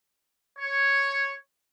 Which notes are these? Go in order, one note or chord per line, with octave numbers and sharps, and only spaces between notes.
C#5